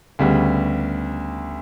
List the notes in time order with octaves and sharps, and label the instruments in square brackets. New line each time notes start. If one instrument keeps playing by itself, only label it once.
[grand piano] D2 C#3 G3 B3